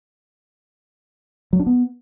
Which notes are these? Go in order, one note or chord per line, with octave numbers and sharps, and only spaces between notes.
F#3
D4
B3